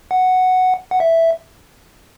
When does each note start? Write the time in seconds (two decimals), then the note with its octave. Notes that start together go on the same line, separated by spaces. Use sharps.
0.11 F#5
0.91 F#5
1.00 E5